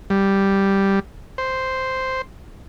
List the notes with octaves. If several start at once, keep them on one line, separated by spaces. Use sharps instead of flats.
G3
C5